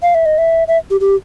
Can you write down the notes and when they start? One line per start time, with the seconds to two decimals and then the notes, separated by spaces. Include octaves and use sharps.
0.02 F5
0.15 E5
0.26 D#5
0.38 E5
0.68 E5
0.90 G4
1.00 G4